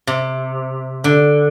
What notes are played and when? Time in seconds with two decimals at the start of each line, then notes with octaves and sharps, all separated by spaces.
0.07 C3
1.04 D3